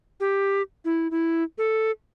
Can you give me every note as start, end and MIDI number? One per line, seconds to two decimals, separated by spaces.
0.20 0.62 67
0.85 1.10 64
1.11 1.43 64
1.58 1.91 69